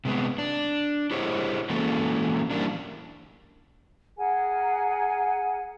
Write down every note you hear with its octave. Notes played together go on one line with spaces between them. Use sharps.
C3 G#3 B3
D4
E4 G4 G#4 C5 C#5 D#5
E3 G#3 A#3 C#4 F#4 A4
E3 G3 A#3 D4
G#4 A#4 F#5 G#5